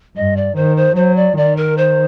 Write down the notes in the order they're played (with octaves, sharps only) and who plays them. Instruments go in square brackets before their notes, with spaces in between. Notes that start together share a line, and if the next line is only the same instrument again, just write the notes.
[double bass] G2 [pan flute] D#5
[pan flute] D5
[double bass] D#3 [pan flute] C5
[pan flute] C5
[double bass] F#3 [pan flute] C5
[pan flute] D5
[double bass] D#3 [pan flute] D5
[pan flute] A#4
C5